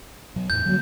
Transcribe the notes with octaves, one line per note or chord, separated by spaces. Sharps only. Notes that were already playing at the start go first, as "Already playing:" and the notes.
B2 F#3
E2 A2 G6
D3 F#3 G3 A#3